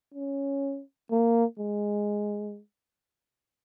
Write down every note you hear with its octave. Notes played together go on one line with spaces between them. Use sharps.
C#4
A#3
G#3